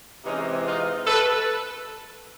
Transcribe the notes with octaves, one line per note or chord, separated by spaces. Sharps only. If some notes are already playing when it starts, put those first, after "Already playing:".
C3 E3 G#3 C4 C#4 D#4
D#4 F4
A4 B4